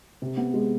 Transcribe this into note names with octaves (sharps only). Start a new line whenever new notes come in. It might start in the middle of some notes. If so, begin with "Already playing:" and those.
C3
B3
G#3